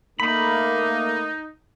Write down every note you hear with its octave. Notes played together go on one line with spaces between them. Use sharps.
A3 A#3 D#4 B5